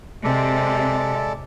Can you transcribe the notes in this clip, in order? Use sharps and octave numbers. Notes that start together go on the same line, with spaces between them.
C3 G#3 A4 D5